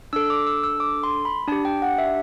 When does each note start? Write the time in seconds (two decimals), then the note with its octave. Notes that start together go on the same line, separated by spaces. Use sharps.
0.13 D4 A4 E6
0.30 D6
0.47 E6
0.64 E6
0.80 D6
1.03 C6
1.25 B5
1.48 D4 G4 A5
1.65 G5
1.82 F#5
1.98 E5